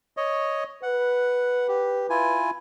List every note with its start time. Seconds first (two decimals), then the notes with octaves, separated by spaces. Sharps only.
0.17 C#5 D#5
0.83 B4 F#5
1.68 G4
2.10 E4 F4 G#5